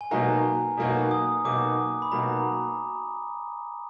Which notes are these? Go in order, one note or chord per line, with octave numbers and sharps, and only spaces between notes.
G#5
B2 F#3 A#3 D#4 F#4 A#5
B2 F#3 A#3 D#4 F#4
D#6
B2 F#3 A#3 D#4 F#4 D6
B5
B2 F#3 A#3 D#4 F#4 A#5